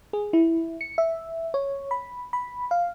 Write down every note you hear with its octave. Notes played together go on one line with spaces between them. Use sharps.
G#4
E4
C#7
E5
C#5
B5
B5
F5